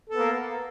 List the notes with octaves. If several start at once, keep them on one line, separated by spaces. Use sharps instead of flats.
A#3 B3 A4